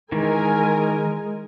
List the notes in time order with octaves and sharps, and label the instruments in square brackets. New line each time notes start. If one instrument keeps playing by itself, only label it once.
[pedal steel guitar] D#3 E3 [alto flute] G#3 [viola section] A#4 G#5